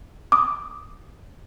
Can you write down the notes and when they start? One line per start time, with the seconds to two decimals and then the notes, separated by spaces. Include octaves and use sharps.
0.32 D6 D#6